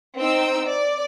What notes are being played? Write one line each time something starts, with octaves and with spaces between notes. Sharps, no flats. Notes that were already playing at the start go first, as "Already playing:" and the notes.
C4 D#4 G5 E6
D5